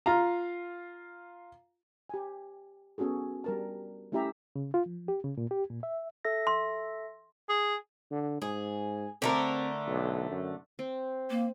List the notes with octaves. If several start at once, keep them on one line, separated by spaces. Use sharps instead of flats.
F4 F5 A#5
G4 G#5
B3 C#4 F#4 G#4 A4
G3 A#4 A5
A3 C#4 E4 G4 E5 A#5
C#3
F4
F3
G4
C#3
A#2
G4
A#2
E5
A4 E5 A#6
C6
G#4
D3
G#2 G#4
D3 A3 C4 A#4
B1
F#2
C4
A#3